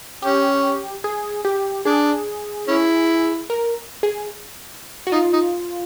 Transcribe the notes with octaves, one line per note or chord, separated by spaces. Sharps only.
C#4 G4
G#4
G4
D4 G#4
C#4 E4
A#4
G#4
F#4
D#4 F4
D#4